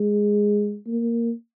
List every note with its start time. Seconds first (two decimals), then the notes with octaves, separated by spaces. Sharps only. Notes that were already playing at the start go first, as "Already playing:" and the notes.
Already playing: G#3
0.87 A#3